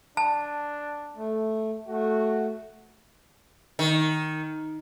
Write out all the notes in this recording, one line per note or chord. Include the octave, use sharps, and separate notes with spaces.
D4 A5
A3
A3 F#4
D#3